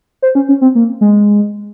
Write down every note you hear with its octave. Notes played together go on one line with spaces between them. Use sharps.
C5
C#4
C#4
C4
A#3
G#3